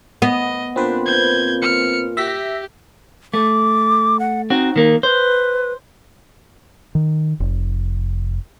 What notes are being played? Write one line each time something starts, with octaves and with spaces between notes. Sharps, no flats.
B3 D#5
A#2 C4 D4 B4 C5
G6 G#6
F6 C#7
G4 E5 A#6 B6
A3 D6
F#5
C4 D#4 F#4
D#3 A#3
B4 C5
D#3
F1